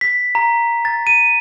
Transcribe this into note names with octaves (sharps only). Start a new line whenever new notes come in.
B6
A#5
A6
D#7